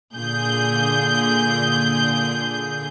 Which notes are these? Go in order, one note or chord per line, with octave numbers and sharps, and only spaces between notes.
A#2 D3 G#4 G6